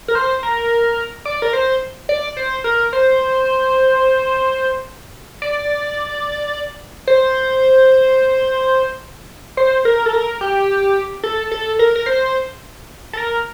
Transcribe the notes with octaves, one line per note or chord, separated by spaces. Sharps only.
A#4
C5
A#4
D5
A#4
C5
D5
C5
A#4
C5
D5
C5
C5
A#4
A4
A#4
G4
A4
A4
A#4
A#4
C5
A4
A#4